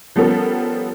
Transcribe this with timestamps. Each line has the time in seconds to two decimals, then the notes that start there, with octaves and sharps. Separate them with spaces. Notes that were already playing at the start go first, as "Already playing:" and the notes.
0.16 F3 G3 B3 C#4 A4 A#4